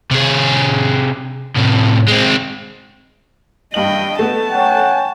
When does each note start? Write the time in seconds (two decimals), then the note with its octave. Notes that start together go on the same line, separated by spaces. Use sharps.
0.11 C3 G#4
1.56 A2 C3
2.08 G#3 C4
3.74 G2 D#5 G5 F#7
4.19 A3 B3 A5
4.52 C#4 F#5 G5